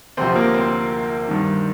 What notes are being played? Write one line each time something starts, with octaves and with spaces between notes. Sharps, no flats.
D2 C3 F3 C4 C5
A#3 A#4
C4 C5
G2 D#3